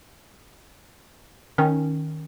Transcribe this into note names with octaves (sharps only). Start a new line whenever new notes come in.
D#3 C#4